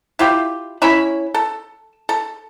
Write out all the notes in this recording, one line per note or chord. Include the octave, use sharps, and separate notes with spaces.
E4 F4 G4
C#4 E4 C#5 B5
A4
A4